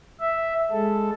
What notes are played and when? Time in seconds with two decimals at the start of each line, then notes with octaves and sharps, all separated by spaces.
0.21 E5
0.71 G#3 A4